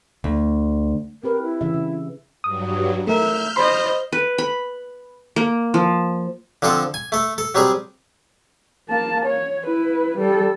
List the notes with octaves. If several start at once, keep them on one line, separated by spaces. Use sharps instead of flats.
D2
C4 G4 A#4 B4
E4
C#3 E3 E5
C#3
G2 F#3 D#6
A3 A#4 E5 F6 G6
C5 D#5 B5 C6
B4
B5
A#3
F3
D3 F3 C4 F4 A4
G#5
A3 A4
A4
F#3 G3 C4 G#4
A#3 A5
C#5
E4 B4
G3 A4